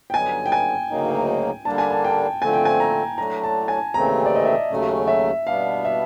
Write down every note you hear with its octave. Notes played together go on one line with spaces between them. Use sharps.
G5
G2 D3 F#3 B3 D#4 G#5
G5
G#5
D2 C#3 F#3 A#3 D#4
D3 G3 A#3 D4 A5
G#5
A5
G5
D3 F3 A3 C4 G#5
G5
G#5
A#5
A2 F#3 A3 D4 A#5
A5
G#5
D#2 C#3 E3 A3 C4 A#5
D5
D#5
E5
D#2 C#3 F#3 A3 C#4
E5
B2 G3 B3 D4 F5
E5